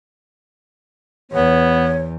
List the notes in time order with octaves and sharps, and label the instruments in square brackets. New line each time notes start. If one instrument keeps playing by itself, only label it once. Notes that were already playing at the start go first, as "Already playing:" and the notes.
[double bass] E2 [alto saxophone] B3 [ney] C#5